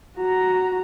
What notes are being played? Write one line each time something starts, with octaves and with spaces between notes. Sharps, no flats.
F#4 A#5